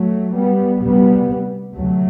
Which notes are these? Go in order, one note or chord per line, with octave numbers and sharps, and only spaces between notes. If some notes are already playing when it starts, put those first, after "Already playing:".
Already playing: F#3 A3
G3 B3
D2 C3 G3 B3
D2 C3 F#3 A3